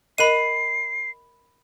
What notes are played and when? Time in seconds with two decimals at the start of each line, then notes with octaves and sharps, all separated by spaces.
0.18 A#4 D#5 B5 C7 D#7